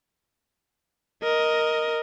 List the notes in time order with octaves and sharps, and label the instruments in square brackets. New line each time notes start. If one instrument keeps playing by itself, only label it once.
[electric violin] A#4 D#5